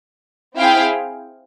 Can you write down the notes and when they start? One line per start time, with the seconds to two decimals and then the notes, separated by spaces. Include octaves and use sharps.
0.57 C4 E4 G#4 F5 G5